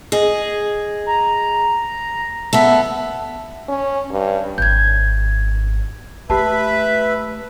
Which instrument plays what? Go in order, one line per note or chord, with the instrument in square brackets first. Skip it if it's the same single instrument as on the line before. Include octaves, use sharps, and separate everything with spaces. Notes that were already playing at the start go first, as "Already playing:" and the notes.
[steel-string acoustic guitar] G#4 D#5
[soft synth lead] A#5
[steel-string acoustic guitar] B3 A4 [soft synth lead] E5
[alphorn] C#4
G2
[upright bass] G#1 [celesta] G6 G#6
[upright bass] A3 [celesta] G4 A5 [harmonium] B4 E5